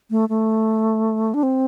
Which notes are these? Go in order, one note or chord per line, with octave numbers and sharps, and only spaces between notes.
A3
A3
D4
C4